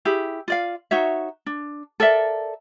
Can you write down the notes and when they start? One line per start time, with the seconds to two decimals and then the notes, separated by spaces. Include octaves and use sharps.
0.05 E4 G4 G#4
0.48 F4 D5 F5
0.91 D#4 F#4 C#5 E5
1.46 D4
2.00 A4 A#4 D5 E5